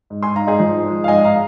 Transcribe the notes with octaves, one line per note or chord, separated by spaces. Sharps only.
G#2
G#5 C6
G#2 F5 A#5
D#4 G#4
F3
G#3
F5
G#2 D#5 G#5
F5 A#5